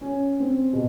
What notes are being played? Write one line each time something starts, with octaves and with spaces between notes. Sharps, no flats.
C#4
C4
B2